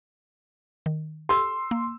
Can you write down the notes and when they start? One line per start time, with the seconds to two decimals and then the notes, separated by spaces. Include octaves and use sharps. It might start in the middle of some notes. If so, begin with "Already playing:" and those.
0.86 D#3
1.29 G4 A4 C6 E6
1.71 A#3